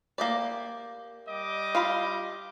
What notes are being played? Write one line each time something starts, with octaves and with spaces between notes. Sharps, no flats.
A#3 G4 D5
G3 D#5 D6
F4 F5 B5